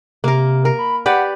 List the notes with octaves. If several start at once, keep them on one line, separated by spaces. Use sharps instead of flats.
C3 A#3 A#4
A#4
B5
G4 B4 D5 F#5